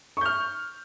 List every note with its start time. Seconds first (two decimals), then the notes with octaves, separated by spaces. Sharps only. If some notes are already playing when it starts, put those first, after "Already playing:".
0.17 C#6
0.21 G6
0.25 F6